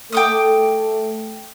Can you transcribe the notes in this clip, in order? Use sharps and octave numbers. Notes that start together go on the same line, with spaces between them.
A3 A4 G5 D6 D#6